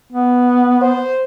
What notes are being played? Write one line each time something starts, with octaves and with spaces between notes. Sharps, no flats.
B3
C5